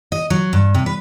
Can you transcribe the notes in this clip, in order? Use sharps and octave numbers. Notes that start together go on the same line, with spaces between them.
D#5
F#3
G2
C3
B4